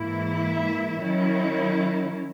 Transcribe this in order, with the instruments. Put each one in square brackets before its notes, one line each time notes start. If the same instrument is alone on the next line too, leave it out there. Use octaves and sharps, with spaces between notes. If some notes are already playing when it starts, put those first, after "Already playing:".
Already playing: [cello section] G#2 E3 A#3 E4
E5
D#3 F#3 C#4 E4